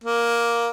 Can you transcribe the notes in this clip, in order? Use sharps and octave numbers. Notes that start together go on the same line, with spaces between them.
A#3